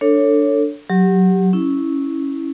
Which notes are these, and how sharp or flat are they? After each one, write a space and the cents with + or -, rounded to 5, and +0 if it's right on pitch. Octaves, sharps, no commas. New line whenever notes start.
D4 +0 A4 +25 C#5 +0
F#3 +0 G4 +0
C#4 -5 E4 -15